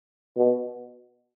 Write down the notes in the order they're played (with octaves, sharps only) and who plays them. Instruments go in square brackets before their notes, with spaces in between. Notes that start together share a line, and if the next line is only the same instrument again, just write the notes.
[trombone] B2